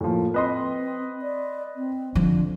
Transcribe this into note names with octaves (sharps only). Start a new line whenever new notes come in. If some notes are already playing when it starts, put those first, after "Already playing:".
A2 F3 A#3
C4 B4 D#5 C6
D5
C4
D3 F3